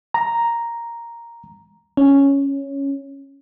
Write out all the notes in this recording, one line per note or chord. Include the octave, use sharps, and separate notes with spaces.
A#5
C#4